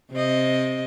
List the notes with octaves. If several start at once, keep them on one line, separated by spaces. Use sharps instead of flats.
C3 C4 D#5